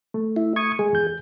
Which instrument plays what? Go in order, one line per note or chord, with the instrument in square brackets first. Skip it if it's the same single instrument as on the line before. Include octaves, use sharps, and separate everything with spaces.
[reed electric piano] A3
[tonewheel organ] E4
C#6 D#6 G#6
[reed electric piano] G#3 [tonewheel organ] G#4
[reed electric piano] E2 G6